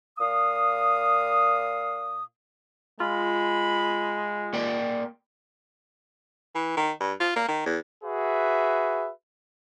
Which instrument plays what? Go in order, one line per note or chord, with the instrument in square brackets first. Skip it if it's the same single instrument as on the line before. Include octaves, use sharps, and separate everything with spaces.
[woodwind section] A#2 F5 D#6
[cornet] G#3 [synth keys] F4 [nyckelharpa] B5
[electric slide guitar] A#3 D5 G5
[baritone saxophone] E3
D#3
G2
F4
A#3
D#3
E2
[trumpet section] F#4 G#4 B4 E5